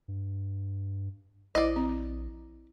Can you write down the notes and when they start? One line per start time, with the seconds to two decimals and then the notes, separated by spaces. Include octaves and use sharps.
0.08 G2
1.55 A#1 E4 C5 D5 D#5 D6
1.76 C4